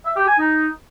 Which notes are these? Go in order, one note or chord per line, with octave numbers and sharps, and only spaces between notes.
E5
G4
G#5
D#4